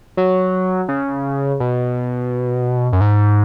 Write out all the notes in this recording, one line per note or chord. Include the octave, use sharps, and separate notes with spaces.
F#3
C#3
B2
F#2
G#2